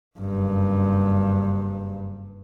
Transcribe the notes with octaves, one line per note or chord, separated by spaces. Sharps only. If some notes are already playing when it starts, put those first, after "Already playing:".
F#1 G2